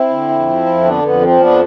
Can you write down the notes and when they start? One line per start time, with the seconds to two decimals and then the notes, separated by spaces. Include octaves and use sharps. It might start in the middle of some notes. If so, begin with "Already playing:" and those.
Already playing: C4 E4
0.10 D3
0.29 F2
0.47 F3
0.66 F2
0.84 D3 B3 D4
1.03 F2 B3
1.22 F3 C4
1.41 F2 B3 D4